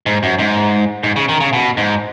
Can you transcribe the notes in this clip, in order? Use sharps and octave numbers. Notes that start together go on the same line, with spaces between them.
G#2
F#2
G#2
G#2
C#3
D#3
C#3
B2
G#2